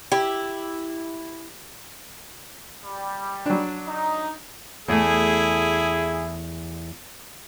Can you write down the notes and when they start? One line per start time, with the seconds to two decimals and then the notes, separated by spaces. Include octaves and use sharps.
0.12 E4 G4
2.83 G3
3.46 F#3 D4
3.88 D#4
4.88 E2 A3 E4 G#4